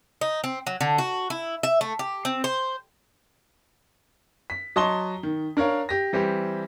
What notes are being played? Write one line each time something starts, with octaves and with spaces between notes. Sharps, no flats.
D#4
C4
F#3
D3
F#4
E4
E5
A3
G4
C4
C5
B6
F#3 D#5 A5 C6 C#6 G7
D#3
D4 A#4 C#5 F5
G4 A#6
E3 G3 C4 G4